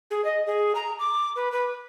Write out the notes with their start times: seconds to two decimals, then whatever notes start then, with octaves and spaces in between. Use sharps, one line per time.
0.11 G#4
0.25 D#5
0.46 G#4
0.75 A#5
0.99 D6
1.36 B4
1.52 B4